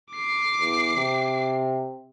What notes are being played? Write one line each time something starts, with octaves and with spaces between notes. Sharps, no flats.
D6 C7
E2
C3